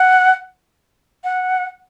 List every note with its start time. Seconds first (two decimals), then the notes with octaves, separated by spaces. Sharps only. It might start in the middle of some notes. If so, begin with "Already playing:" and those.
Already playing: F#5
1.24 F#5